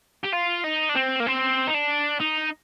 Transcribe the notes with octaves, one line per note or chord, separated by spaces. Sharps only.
G4
F4
D#4
D4
C4
A#3
C4
D#4
D4
D#4